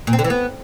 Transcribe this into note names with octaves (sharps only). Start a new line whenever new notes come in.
A#2
C4
D3
E3
B3